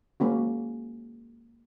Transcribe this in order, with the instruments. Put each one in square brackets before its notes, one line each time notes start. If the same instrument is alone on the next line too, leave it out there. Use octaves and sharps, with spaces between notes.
[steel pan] G#3 A#3 C#4 F#4